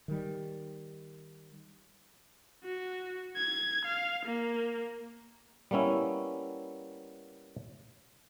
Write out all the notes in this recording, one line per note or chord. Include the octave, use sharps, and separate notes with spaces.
D#3 G3
F#4
G#6
F5
A#3
G3 A#3 B3 C#4 E4